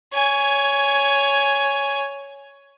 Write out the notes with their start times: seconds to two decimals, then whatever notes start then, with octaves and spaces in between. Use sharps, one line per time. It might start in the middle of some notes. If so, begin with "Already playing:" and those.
0.14 C#5 G#5